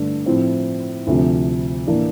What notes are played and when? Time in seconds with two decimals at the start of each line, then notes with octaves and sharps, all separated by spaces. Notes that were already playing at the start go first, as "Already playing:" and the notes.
Already playing: G2 D3 A3
0.26 A2 F3 C4 E4
1.07 D2 C3 F3
1.87 A2 E3 A#3 D4